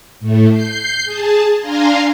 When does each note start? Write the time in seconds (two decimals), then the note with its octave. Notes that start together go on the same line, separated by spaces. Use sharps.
0.20 A2 A3
0.51 G6 C7
1.04 G#4 A5
1.59 D4 F5 G#5 A#5 C6